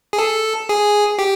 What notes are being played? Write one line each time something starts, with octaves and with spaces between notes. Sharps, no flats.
G#4
A4
G#4
G4